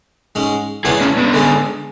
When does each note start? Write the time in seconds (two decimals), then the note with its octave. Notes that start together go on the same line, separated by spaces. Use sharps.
0.35 G#2 G#3 C#4
0.85 C#3 E3 G#3 B3 D4 E4 G#4
1.01 C#4 E4
1.17 B3 D4
1.33 D3 G#3 C#4